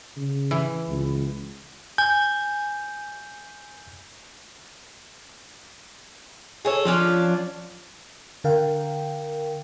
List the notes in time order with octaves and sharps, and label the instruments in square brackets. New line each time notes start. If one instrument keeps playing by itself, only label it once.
[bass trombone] C#3
[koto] E3
[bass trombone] C#2
[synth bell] G#5 [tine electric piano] G6
[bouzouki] G#4 A4 C#5
[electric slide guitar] F3 [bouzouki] C#4 D4 F4
[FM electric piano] D3 A#4 F5 G5